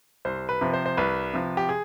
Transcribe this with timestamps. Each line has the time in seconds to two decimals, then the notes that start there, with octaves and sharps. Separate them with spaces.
0.25 C2 C5
0.49 B4
0.61 C3 F3
0.74 C5
0.86 C5
0.97 C2 B4
1.34 C3 F3
1.57 G4
1.69 G#4